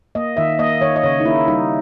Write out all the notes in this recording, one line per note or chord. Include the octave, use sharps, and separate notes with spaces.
A#3 D#5
D#3 E5
A#3 D#5
D#3 C#5
D#5
C#3 C#5
D#4
A#3 E4
G3 D#4